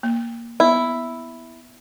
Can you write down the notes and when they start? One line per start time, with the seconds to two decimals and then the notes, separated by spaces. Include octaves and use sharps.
0.03 A#3
0.60 B3 E4